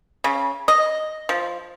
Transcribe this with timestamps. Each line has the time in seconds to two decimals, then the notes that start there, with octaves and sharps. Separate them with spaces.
0.24 C#3
0.68 D#5
1.29 F3